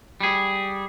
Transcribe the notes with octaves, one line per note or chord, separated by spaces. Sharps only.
G3 G#4